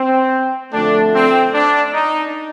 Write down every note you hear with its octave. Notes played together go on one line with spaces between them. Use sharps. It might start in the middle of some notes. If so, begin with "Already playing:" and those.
Already playing: C4
F2 D3 A3 D4
C4
D4
D#4